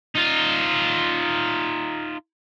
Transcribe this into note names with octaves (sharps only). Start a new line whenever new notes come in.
D#4 F4